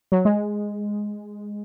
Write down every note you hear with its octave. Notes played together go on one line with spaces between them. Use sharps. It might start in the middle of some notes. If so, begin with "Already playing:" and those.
F#3
G#3